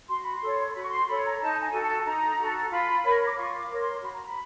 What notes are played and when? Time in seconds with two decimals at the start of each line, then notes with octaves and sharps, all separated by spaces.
0.08 F#4 C6
0.21 B5
0.34 C6
0.41 A4 C#5
0.69 C6
0.73 F#4 B5
0.83 C#6
0.90 C6
1.07 A4 C#5 B5
1.24 A#5
1.39 D#4 A5
1.61 G#5
1.72 F#4 A4
1.83 A5
2.05 D#4 A#5
2.37 F#4 A4
2.70 F4 B5
3.04 A#4 C#5
3.26 D6
3.36 F4 C#6
3.58 D6
3.68 A#4 C#5
3.80 C6
4.01 F#4 B5
4.13 A#5
4.26 B5